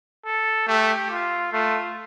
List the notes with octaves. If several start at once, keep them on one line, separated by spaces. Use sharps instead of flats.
A4
A3 G4
F4
A3 F4